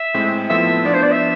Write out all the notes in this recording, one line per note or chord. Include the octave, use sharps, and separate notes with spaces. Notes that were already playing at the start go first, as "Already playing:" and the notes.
Already playing: E5
A2 G#3 C4
A2 F3 B3 F4 A4 E5
F3 B3 D4 F4 D5
C5
D5
E5